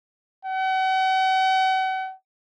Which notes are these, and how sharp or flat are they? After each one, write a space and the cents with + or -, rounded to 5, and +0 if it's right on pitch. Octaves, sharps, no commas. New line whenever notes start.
F#5 +40